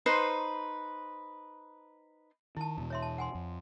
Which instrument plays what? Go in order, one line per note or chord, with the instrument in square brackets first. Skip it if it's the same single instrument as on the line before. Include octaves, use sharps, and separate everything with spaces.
[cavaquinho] D#4 B4 C5 C6
[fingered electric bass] D#3 [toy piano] E4 A5
[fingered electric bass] E2 B2
[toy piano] C#5 E5 C6
A5
F#5 G#5 C6
[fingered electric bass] F2